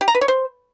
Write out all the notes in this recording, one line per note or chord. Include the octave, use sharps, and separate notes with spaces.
G4
A#5
B4
C#5
C5